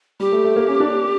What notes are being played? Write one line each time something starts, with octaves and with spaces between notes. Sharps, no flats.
G3 G4
A3
A3
A#3
C#4
D4